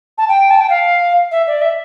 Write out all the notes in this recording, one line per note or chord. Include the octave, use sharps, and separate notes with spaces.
A5
G5
A5
G5
F5
E5
D5
E5